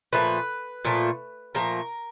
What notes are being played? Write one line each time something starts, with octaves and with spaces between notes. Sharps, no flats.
A#2 F3 A3 B4
A#2 F3 A3
A#2 F3 A3 A#4